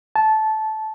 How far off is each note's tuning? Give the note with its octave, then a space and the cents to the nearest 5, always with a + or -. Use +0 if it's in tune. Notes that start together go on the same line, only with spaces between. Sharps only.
A5 -15